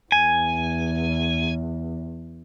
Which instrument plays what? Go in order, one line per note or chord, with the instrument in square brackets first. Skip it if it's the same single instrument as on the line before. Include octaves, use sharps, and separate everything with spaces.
[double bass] E2 [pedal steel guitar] G#5